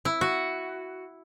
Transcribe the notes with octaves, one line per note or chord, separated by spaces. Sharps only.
E4
F#4